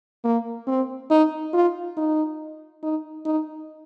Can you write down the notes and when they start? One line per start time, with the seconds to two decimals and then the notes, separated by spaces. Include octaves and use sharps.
0.24 A#3
0.67 C4
1.10 D#4
1.53 F4
1.97 D#4
2.83 D#4
3.25 D#4